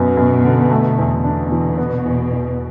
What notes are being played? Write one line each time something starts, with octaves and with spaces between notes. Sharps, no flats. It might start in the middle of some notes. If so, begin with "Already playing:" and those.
Already playing: F#2 B2 B3
F#2
D3
A3
E2
B2 D4
E3
B3
E2
E2